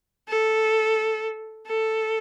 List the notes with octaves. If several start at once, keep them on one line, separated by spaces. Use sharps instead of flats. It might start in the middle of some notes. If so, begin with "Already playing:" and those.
A4
A4